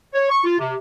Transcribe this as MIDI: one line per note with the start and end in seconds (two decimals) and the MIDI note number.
0.13 0.28 73
0.30 0.41 85
0.44 0.57 65
0.59 0.74 48